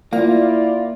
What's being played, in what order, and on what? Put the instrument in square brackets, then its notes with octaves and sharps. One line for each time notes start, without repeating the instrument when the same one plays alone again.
[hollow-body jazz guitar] A#3 [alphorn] E4 [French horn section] F4 D5 [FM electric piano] F5